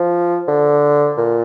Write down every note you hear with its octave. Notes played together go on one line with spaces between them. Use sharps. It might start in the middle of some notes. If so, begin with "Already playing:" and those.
Already playing: F3
D3
A#2